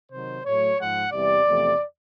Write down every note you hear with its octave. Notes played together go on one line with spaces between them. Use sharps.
C3 D#3 F#3 C5
A2 F#3 A3 C#5
G#2 F3 G#3 F#5
E2 C3 E3 G3 D5
E2 C3 F3 A3